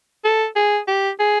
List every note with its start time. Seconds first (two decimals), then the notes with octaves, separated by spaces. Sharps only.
0.24 A4
0.56 G#4
0.87 G4
1.19 G#4